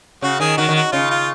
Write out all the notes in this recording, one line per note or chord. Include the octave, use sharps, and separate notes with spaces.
C#3 F#4
D#3 G#4
D#3 F#4
D#3
F#4
C#3 F4
F4